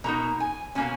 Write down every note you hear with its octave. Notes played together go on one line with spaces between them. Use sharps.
B2 A#3 D#4 A#5
G#5
B2 A#3 C#4 G#5